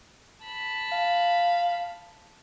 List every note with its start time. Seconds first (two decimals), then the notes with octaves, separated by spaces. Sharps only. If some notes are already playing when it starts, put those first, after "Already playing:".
0.44 A5 B5
0.92 F5